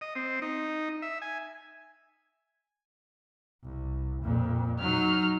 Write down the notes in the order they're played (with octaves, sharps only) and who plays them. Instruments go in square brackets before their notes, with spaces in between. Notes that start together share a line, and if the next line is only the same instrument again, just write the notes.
[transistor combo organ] D#5
C4
D#4
E5
G#5
[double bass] C2
F2 A#2
[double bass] F#3 [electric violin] D#4 F6